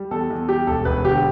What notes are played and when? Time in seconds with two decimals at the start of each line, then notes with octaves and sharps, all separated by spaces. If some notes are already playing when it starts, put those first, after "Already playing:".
Already playing: G3
0.11 E2 A4
0.30 E2
0.49 G3 G4
0.67 E1 A4
0.85 E1 B4
1.05 D3 G4